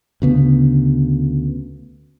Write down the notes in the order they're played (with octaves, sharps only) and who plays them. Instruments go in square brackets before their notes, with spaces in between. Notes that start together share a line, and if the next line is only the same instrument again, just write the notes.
[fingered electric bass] D2 C#3 B3